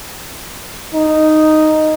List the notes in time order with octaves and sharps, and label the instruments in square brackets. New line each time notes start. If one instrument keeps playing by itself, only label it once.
[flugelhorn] D#4